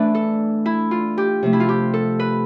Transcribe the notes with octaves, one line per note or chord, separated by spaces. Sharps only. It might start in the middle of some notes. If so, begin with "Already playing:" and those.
Already playing: E3 A3 D4 B4 D5 E5
A4
E4
F4
G4
C3 F3 A3
E4
F4
G4
A4
B4